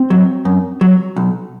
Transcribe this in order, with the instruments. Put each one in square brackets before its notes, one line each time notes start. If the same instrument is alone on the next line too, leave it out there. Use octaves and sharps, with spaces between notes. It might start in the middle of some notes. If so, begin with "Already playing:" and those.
Already playing: [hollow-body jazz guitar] C4
F#3
F#2
F#3
B1